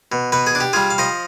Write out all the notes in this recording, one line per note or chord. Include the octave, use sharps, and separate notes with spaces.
B2
B2 B4
G#4
D4
G4
G3 F4 G#4
F5
F3 C5 D#5